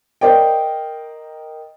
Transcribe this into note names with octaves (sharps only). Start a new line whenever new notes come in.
A#4 C5 D5 D#5 G5